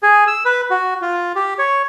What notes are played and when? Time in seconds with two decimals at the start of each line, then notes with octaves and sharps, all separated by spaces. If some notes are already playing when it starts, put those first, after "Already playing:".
0.03 G#4
0.27 E6
0.45 B4
0.71 F#4
1.02 F4
1.36 G4
1.59 C#5